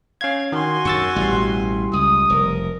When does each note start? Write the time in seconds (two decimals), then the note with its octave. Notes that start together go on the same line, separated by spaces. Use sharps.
0.21 C#4 F5 G#6
0.52 D#3 F#4 G#5 C6
0.85 F#2 C#6 E6 A6
1.16 A1 B2 G3
1.93 C#2 D#6
2.30 F1 A#4